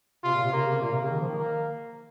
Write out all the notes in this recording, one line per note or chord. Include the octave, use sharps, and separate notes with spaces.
C3 F4
A#2
C3
C#3 A#3
C3
A#2 A#3
C3
C#3
D#3
F3
D#3
A#3